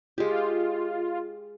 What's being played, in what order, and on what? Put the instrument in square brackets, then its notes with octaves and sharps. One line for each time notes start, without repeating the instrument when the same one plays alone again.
[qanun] G#3 G4 [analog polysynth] F4